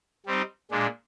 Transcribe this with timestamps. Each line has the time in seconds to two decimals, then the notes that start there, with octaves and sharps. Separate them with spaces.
0.26 G3 C4 D#4
0.71 A#2 G#3 D4